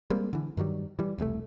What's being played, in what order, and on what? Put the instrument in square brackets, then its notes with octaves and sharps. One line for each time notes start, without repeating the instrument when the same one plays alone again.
[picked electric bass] G3 G#3 A#3 C4
D3 E3
G2 D#3 F#3 G3
E3 G3
E1 C2 A#2 A3